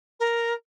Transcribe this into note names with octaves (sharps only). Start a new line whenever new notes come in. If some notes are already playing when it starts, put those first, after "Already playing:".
A#4